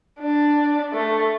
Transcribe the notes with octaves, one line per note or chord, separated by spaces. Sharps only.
D4
A3